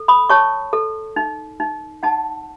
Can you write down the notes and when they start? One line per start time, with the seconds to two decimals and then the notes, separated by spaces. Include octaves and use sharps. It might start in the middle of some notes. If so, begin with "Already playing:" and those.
Already playing: A4
0.08 B5 D#6
0.29 C#5 A5 C#6
0.73 A4
1.16 D#4
1.60 D#4
2.03 D#4 F#5 A5